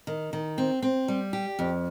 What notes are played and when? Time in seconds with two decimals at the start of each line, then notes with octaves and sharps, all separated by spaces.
0.07 D#3
0.33 D#3
0.58 C4
0.82 C4
1.08 G3
1.33 G4
1.59 F2